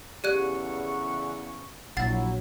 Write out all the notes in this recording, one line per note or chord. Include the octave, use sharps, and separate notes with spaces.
E2 C#3 G4 A4 D5 F#5 C#6 F#6
A#1 F#3 E4 F#5 A6